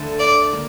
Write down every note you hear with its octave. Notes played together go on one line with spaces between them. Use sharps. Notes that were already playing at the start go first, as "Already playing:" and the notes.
Already playing: D2 D3 A3
D5
A#3